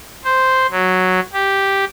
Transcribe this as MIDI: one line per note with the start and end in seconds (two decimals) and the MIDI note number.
0.25 0.67 72
0.71 1.20 54
1.33 1.85 67